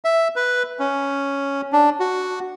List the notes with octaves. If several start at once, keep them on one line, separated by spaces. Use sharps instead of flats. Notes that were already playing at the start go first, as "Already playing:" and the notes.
E5
B4
C#4
D4
F#4